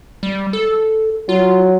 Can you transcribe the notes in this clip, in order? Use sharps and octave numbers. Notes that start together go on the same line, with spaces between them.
G3
A4
F#3 F4